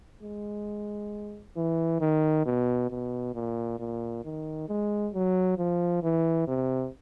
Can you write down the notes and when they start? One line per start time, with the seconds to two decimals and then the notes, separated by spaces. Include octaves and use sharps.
0.22 G#3
1.57 E3
2.01 D#3
2.46 B2
2.90 B2
3.35 A#2
3.79 A#2
4.24 D#3
4.69 G#3
5.14 F#3
5.58 F3
6.03 E3
6.48 C3